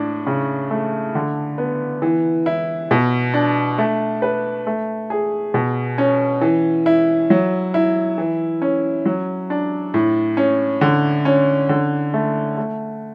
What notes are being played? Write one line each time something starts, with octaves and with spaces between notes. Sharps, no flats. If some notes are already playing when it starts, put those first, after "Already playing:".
Already playing: A2 D4
C#3
A3
D3
B3
E3
E4
B2
D4
A3
B4
A3
G#4
B2
C#4
E3
E4
F#3
E4
E3
C#4
F#3
D4
A2
C#4
D3
C#4
D3
A3
A3